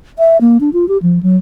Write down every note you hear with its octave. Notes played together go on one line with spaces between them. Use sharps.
E5
A#3
D4
F4
G4
F3
F#3